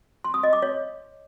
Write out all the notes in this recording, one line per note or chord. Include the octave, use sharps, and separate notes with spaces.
C6
D#6
D#5
D6
C#5